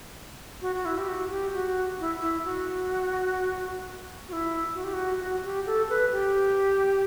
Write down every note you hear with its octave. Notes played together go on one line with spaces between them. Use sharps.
F#4
F#4
E4
G4
F#4
G4
F#4
E4
E4
F#4
F#4
E4
F#4
G4
F#4
F#4
G4
A4
B4
G4